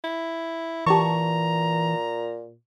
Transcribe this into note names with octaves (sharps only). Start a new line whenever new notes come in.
E4
A#2 E3 G4 A5 A#5 C#6